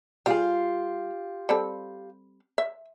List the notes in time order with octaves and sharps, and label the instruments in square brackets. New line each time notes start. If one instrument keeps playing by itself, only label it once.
[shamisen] G3 G#4 [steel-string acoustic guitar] F4 G4 F5
[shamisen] G3 C4 A4
E5